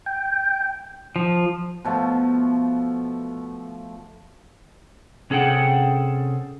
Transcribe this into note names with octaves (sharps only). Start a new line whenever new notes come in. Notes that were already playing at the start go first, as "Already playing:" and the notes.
G5
F3
B2 F3 A3
C3 C#4 G#4 A4 F#5 G5